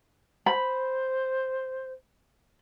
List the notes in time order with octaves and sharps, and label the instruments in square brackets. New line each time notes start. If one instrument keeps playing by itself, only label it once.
[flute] C5 [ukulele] B5